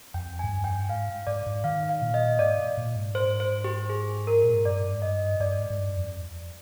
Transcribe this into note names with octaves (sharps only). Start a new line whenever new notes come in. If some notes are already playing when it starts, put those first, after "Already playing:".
F2 G5
G#5
G#2
G2
G5
G#2 F5
G#2 D5
G#2
D#3 F5
F5
A#2
D#5
G#2 D5
A#2
G#2
C5
C5
G4
G#4
A#4
A#2
G#2
G2 D5
G#2
G2 D#5
G2 D5
G#2
G#2
G2
F2